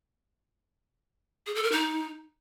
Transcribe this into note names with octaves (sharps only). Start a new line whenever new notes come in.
G#4
A4
A#4
D#4